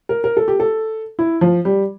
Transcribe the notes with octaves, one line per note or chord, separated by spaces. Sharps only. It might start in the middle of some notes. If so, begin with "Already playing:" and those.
A#4
A#4
A4
G4
A4
E4
F3
G3